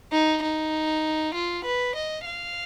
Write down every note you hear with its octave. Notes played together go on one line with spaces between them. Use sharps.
D#4
D#4
F4
B4
D#5
F5